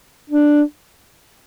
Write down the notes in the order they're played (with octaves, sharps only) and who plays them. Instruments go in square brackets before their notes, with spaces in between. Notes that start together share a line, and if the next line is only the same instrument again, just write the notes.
[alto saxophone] D4